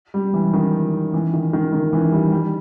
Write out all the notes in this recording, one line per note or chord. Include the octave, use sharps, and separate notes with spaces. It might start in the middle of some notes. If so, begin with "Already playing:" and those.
G3
E3
D#3
E3
D#3
D#3
D#3
E3
G3
G3